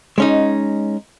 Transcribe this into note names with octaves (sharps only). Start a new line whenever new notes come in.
G#3 C#4 D#4